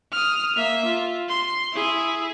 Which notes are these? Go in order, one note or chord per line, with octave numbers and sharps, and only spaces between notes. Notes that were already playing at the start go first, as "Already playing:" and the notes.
D#6 F6
A#3 E5
F4
C6
E4 G#4